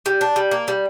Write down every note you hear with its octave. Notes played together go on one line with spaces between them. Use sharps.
G3
D4
G3
A#3
G3